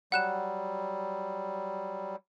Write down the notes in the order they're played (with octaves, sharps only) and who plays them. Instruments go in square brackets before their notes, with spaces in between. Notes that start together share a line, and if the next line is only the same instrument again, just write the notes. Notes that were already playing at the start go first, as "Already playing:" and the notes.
[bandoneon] F#3 G3 [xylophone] F#5 F#6 E7